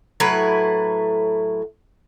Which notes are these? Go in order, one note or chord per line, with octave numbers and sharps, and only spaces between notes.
A2 F#3 E4 B4